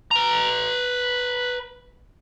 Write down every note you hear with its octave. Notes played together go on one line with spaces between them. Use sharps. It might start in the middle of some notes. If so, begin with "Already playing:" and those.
B4 A#5